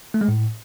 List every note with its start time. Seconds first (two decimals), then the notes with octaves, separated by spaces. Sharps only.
0.14 A3
0.21 G#3
0.28 A2